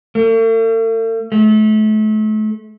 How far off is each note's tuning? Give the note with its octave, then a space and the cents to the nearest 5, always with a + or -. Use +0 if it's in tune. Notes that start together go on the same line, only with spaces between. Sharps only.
A3 +45
A3 -35